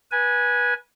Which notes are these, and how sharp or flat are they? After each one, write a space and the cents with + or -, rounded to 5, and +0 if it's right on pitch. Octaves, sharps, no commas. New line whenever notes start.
B4 -25 G#5 +0